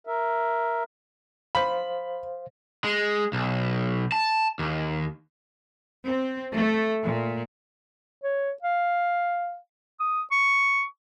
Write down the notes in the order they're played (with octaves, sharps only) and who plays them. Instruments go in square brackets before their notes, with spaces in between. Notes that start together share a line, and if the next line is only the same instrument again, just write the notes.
[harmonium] A#4 E5
[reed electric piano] C5 F5 [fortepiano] B5
[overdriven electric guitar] G#3
B1
A5
D#2
[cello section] C4
A3
A#2
[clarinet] C#5
F5
D#6
C#6